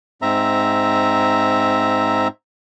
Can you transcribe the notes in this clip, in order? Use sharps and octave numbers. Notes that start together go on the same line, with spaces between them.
G#2 C4 E5 A#5